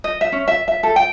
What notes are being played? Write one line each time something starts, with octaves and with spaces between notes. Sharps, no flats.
D#5
E5
C#4
E5
E5
A4
G5